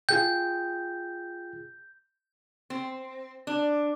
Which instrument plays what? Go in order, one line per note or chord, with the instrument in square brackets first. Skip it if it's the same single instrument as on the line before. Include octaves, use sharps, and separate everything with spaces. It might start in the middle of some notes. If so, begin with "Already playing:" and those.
[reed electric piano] F4 G#4 G5 [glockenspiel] G6
[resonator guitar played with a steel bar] C4
D4